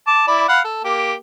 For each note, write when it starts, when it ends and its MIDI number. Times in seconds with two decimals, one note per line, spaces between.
0.07 0.24 81
0.07 0.24 86
0.28 0.47 64
0.28 0.47 74
0.28 0.47 83
0.49 0.60 77
0.49 0.60 78
0.49 0.60 83
0.64 0.80 69
0.84 1.14 58
0.84 1.14 67